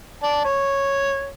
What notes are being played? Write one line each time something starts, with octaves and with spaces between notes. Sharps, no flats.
D5 A5
C#5